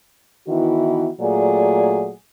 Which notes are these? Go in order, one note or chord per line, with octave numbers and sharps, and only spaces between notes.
D#3 E3 B3 E4 F#4
A#2 F#3 A3 G#4 D5